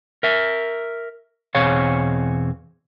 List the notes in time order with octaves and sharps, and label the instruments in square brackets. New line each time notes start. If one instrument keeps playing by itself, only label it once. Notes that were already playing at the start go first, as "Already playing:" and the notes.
[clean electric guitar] A#4 E5
E2 B2 C4 G#4 C#5 F5